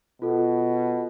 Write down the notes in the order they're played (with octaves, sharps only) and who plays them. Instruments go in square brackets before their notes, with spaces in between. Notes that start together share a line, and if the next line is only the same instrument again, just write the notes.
[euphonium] B2 [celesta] F4 A4